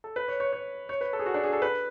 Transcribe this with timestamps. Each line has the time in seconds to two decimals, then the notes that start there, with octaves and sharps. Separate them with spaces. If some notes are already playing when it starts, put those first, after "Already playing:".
0.04 A4
0.16 B4
0.28 C#5
0.40 C#5
0.53 C#5
0.89 C#5
1.01 B4
1.13 A4
1.19 G#4
1.26 F#4
1.34 D4
1.43 G#4
1.53 A4
1.62 B4